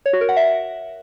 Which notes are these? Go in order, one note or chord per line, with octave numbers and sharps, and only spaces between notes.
C#5
F#4
A#4
F#5
E5